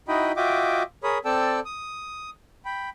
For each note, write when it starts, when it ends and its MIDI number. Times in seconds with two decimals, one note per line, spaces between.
0.08 0.32 63
0.08 0.32 64
0.08 0.32 66
0.08 0.32 75
0.08 0.32 79
0.08 0.32 83
0.37 0.83 65
0.37 0.83 66
0.37 0.83 75
0.37 0.83 76
0.37 0.83 79
0.37 0.83 86
1.04 1.18 68
1.04 1.18 70
1.04 1.18 73
1.04 1.18 83
1.04 1.18 87
1.25 1.60 60
1.25 1.60 69
1.25 1.60 74
1.25 1.60 79
1.25 1.60 81
1.25 1.60 88
1.65 2.30 87
2.65 2.89 79
2.65 2.89 83